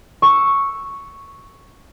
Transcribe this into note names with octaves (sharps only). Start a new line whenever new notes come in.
C#6 E6